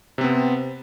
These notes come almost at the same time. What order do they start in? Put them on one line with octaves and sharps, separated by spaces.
C3 C4 B3